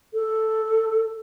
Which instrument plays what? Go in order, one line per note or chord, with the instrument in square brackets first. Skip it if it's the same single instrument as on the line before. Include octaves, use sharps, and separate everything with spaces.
[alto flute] A4